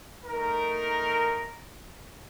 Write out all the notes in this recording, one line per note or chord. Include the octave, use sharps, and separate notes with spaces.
A3 D#4 A#4